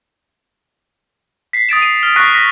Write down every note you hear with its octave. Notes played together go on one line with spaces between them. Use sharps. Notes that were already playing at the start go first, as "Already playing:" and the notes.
B6 C7
D#6 A6 D7 E7
D#7
F6
C#6 F#6 A#6 B6 D#7
A#6 B6